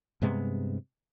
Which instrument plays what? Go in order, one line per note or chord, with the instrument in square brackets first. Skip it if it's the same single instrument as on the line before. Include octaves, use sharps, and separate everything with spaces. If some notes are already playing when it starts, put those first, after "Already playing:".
[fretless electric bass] G2 C3 G#3 B3